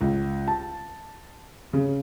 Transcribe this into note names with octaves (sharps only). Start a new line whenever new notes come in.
C#2
A5
C#3